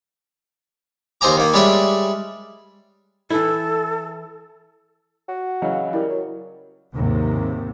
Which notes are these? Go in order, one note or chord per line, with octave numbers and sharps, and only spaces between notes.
D#2 C5 D#5 G#5 A#5 D6
D#3 A#3
G3 G#3 C#5 D5 E5
E3 E4 A4
F#4
C#3 E3 F#3 D#5 F5
G3 E4 A#4
F#3
D#2 G#2 C3